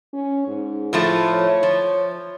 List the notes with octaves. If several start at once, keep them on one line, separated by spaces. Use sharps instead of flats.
C#4
G#2
A2 F3 A3
C#5
F3